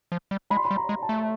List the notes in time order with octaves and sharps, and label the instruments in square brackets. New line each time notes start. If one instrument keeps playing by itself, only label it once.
[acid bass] F3
G3
[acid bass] G#3 [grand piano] B5
[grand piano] C6
B5
[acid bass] G3
[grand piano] A#5
[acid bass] G#3
[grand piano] A5
[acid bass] A3